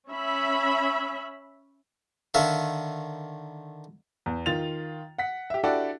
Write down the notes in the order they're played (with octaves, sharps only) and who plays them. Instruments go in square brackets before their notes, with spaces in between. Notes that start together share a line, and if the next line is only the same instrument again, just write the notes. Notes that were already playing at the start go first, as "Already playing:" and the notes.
[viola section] C#4 E5 B5
[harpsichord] D3 D#3 E5 F5
[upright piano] E2
D#3 F4 A6 F7
F#5 B6
G4 E5
D4 E4 F#4 G4 A4 D5